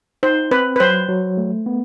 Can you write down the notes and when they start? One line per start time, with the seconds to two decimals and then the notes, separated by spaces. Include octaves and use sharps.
0.23 D#4 C5
0.51 C4 B4
0.76 B4
0.80 F#3 C5
1.09 F#3
1.38 A3
1.66 B3